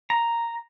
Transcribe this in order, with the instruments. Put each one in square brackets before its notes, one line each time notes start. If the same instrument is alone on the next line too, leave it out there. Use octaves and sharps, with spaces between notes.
[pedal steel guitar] A#5